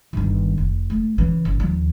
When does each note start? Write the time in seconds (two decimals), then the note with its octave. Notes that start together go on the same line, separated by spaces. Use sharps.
0.13 G1 D#3
0.58 F1
0.90 A3
1.18 C#3 E3
1.45 F#1
1.60 D#2 F3